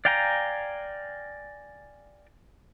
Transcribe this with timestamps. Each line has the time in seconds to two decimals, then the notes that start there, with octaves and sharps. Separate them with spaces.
0.05 D5 F5 G5 G#5 A#5